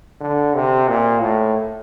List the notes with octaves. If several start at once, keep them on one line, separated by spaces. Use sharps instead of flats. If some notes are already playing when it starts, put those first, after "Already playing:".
D3
C3
A#2
A2